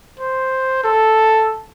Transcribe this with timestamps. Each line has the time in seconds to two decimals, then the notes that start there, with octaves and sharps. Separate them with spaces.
0.20 C5
0.84 A4